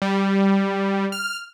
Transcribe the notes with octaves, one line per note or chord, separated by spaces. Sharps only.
G3
F6